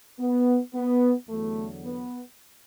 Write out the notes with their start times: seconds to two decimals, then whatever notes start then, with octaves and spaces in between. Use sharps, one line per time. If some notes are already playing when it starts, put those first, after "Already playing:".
0.20 B3
0.74 B3
1.29 E2 D3 F#3 A3
1.84 B3